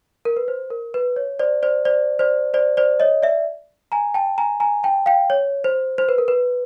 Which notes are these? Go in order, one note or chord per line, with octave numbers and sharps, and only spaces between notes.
A#4
B4
C5
A#4
B4
C#5
C5 D5
C5 D5
C5 D5
C5 D5
C5 D5
C5 D5
C#5 D#5
D5 E5
G#5 A#5
G5 A5
G#5 A#5
G#5 A#5
G5 A5
F5 G5
C#5
C5
C5
B4
A#4
B4